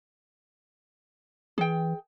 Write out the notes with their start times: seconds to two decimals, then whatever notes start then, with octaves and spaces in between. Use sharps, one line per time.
1.58 E3 G#4 G5